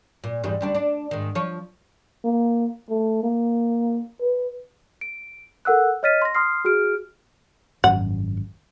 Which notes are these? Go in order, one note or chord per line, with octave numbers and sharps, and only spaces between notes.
A#2
E2 G#2 G3
D2 G3 D4
D4
G#2 D#3
F3 C#5
A#3
A3
A#3
B4
D7
A4 A#4 F#5 E6 F#6
C#5 D#5 F6 A6 B6 D#7
C6 A#6
C6 D#6 F6 C7
F#4 G#4 F6 D7
G#1 F#2 F#5